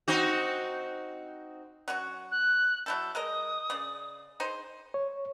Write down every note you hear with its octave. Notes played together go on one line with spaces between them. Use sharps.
C4 D#4 F#4
F#3 C#4 F#4
F#6
F#3 E4 A4 G6
G#3 A#4 D#5 D#6
C#3 D5
D#4 G#4 C5
C#5